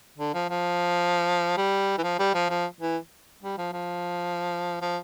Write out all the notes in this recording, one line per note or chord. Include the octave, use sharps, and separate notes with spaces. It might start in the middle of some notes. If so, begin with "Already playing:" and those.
D3
F3
F3
G3
E3
F3
G3
F3
F3
E3
G3
F3
F3
F3